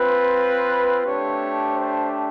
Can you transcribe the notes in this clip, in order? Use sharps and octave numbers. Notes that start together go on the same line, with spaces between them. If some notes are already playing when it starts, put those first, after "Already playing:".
Already playing: C4 F4 B4
A3 D4 G4 C#5
C5